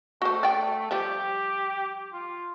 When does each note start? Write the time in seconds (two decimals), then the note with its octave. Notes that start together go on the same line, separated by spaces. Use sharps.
0.22 A3 F#4 C5
0.43 D5 G5
0.91 F3 G3 G4
2.13 F4